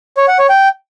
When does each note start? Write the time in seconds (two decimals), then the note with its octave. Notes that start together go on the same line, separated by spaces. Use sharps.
0.17 C#5
0.28 F#5
0.39 C#5
0.50 G5